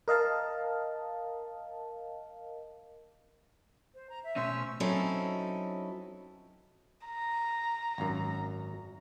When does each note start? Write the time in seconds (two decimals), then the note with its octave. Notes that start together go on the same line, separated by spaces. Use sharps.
0.08 A#4 D#5 F5 A5
3.94 C5
4.09 A#5
4.24 E5
4.36 B2 A3 C#4 C5 C#6 E6
4.80 F#3 C4 C#4 D#4 E4 A4
7.06 A#5
7.98 G#1 F#2